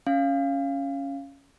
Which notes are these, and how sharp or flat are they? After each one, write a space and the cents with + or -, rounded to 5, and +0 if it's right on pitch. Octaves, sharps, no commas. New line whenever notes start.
C#4 +0 F5 -10